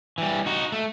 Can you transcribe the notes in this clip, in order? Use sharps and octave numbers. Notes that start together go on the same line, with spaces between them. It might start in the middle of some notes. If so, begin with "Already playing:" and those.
E3 G3
D#4 F#4
A3